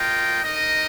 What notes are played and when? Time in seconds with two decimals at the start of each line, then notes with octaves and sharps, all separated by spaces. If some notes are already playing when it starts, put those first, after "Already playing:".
Already playing: F4 A#4 D#5 G5
0.42 D#4 A#4 D#5